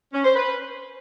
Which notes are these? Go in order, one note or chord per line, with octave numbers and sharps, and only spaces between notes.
C#4
C5
B4